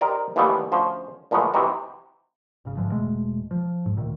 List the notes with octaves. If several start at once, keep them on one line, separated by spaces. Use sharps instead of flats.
D#4 G4 A#4 C5 D5
D#2 E3 F3 G3 A3 B3
D2 F3 C#4 C5
A#2 E3 F3 G#3 A3 B3
C3 E3 D#4 F#4
G#1 C#3
G#2 D3 E3 F3
E1 B2 G#3 A3
F3
G#2
D2 A#2 D#3